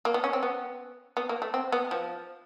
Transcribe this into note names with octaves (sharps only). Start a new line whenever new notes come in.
A#3
B3
C#4
C4
B3
B3
A#3
A3
C4
B3
F3